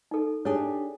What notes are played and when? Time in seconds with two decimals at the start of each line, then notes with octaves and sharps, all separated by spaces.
0.11 D#4 A4
0.45 D4 G4 G#4 C#5